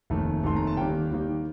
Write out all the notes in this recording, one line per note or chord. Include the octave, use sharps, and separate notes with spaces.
F1 D#2 D#3 A3
F1 D#2 D#3 A3 C6
A#5
A5
D#2 D#3 G3 A#3 G5
D#2 D#3 G3 A#3